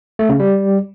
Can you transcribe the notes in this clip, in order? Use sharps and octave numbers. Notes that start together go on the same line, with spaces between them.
A3
C#3
G3